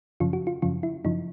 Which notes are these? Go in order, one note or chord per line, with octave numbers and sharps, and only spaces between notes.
F#2 C#3 F3 F4
F#4
F4
F#2 C#3 F3 F4
E4
F#2 C#3 F3 D#4